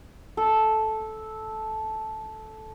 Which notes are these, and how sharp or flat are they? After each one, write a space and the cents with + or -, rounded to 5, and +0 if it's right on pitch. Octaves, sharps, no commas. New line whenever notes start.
A4 -10